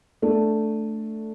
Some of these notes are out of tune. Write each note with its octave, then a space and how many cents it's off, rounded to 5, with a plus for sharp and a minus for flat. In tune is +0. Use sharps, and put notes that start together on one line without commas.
A3 +0 D4 +0